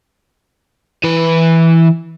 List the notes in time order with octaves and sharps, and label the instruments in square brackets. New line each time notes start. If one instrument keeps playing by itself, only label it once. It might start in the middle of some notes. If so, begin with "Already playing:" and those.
[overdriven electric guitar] E3 B4